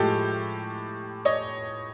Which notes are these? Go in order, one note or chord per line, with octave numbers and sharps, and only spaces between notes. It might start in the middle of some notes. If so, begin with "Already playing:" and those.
Already playing: A2 F3 G#3 G4 A4
C#5 D#5